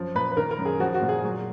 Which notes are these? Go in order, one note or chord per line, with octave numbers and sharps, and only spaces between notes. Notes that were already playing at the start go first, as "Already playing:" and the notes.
Already playing: F#2 F3
A#2 B4
B4
D#3 A#4
A#4
F#2
G#4
F3 F#4
F#4
A#2
G#4
F#3